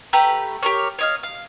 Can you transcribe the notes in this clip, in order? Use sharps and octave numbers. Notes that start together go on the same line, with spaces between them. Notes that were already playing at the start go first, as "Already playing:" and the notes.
A3 G4 B4 A#5
G4 A#4 C#5
C#5 D#5 F5
F5